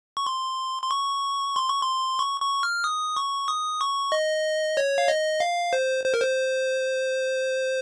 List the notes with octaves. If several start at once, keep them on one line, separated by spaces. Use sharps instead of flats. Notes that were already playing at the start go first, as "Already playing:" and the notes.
C#6
C6
C6
C#6
C6
C#6
C6
C#6
C#6
F6
D#6
C#6
D#6
C#6
D#5
C#5
F5
D#5
F5
C5
C5
A#4
C5